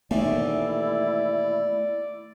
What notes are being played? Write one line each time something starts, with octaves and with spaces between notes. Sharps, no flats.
D#2 B2 E3 A3 E4 D5